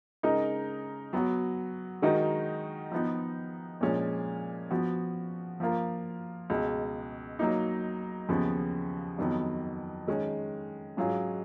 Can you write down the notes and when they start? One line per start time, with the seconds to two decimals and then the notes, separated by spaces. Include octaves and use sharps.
0.23 C#3 G#3 D#4 A#4 D#5
1.13 F#3 B3 F#4
2.02 D#3 G#3 D#4 F#4 A#4
2.92 F3 B3 D#4
3.81 A#2 F3 G#3 C#4
4.71 F3 B3 F#4
5.60 F3 A#3 F4 A#4
6.50 C#2 B2 G#3
7.39 F#3 A#3 D#4
8.29 D#2 C#3 F3 B3
9.18 F2 D#3 F#3 B3
10.07 D#3 G#3 C#4
10.97 G#2 F#3 C#4 F4 G#4